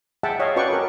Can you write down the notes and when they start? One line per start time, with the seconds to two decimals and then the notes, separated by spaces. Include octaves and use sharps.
0.23 G#4 E5 F#5 G5 A5
0.40 C#5 D#5 F5
0.56 C#4 F#4 B4 D5 G5 C#6
0.70 A4 A#4